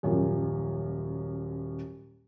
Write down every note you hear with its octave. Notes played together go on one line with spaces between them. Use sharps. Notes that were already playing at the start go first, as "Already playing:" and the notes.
D#1 F#2 F3